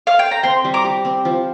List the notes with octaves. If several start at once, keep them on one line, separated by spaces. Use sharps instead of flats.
F5
G5
A#5
C4 G5 C6
G3
A#5 D6
G4
C4
F3